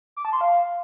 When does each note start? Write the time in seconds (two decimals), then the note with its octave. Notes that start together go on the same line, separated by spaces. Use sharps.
0.17 D6
0.25 A5
0.33 C6
0.41 F5